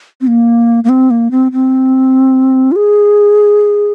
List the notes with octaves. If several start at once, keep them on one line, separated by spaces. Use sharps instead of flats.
C4
A#3
A#3
C4
A#3
C4
C4
F4
G#4